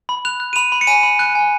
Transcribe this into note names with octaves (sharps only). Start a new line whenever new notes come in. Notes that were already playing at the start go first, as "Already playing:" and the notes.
B5
F#6 F7
F#6
D#7
B5 F7
B5
C#7
G#5 D#7
B5
F#6
G#5